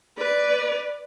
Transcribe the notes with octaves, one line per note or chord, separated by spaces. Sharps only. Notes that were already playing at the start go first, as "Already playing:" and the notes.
B4 D5